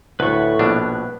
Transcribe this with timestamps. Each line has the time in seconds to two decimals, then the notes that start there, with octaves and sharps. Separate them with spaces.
0.20 D2 A2 B4 C#6
0.59 A#1 B2 D4